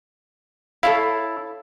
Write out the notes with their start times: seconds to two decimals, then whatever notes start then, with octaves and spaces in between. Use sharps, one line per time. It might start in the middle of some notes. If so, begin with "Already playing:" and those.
0.83 E4 A4 C#5 F5